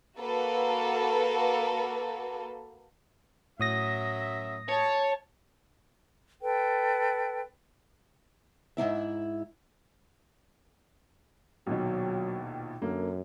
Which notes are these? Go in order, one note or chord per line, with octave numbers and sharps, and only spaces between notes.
A#3 F#4 A4 B4
F#2 A2 F#3 E5 D#6 A#6
C#5 A5
A4 B4 G5
G#2 C#3 E4 E5
A#1 D#2 B2 F#3
F#2 D3 A#3